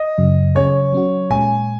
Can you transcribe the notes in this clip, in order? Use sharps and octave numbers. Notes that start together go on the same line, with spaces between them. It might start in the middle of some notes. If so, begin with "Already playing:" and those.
Already playing: D#5
F#2 C#3 F#3
C#3 F#3 C#4 G#4 C#5
F#3 C#4 F#4
A#2 G#3 C#4 G#5